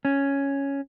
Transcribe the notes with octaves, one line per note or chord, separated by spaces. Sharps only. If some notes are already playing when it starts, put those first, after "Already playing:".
C#4